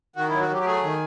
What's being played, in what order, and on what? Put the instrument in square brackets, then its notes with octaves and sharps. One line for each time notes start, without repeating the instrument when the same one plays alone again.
[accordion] D#3 F#4
F#3 E4
F#4
F#3 G4
G4
A3 G#4
D#3